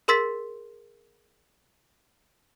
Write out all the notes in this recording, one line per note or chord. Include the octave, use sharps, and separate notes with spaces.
G#4 A#4 C6 E6 A6 B6